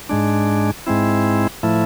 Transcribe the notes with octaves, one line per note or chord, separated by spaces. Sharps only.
G#2 G#3 D4
G#2 G#3 C4 E4
A2 F3 A3 E4